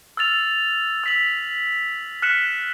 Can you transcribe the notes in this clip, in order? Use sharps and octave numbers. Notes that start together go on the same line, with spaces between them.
E6 F6 A6 F7
E6 B6 F#7
F6 F#6 B6 C#7 E7 F#7